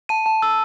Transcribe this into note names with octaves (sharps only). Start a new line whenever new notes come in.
A5 D#7
A5
E6